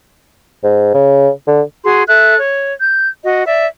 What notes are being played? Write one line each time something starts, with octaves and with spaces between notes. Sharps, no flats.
G#2
C#3
D3
F#4 G#4 C6
A4 E5 F#6
C#5
G6
F#4 D#5
D5 E5